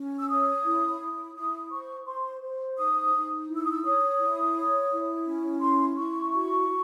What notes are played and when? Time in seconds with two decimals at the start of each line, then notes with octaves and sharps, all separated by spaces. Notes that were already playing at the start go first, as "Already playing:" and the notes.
Already playing: C#4
0.18 E6
0.29 C#5 D#6
0.65 E4
1.00 E4
1.35 E4 D#6
1.71 C5 C#6
2.06 C5 C6
2.43 C5
2.77 D#4 D#6
3.14 D#4
3.48 E4
3.56 E6
3.63 D#6
3.71 E6
3.84 C#5 D#6
4.19 E4
4.55 C#5
4.91 E4
5.25 C#4
5.61 E4 C6
5.97 E4 C#6
6.33 F#4
6.68 F#4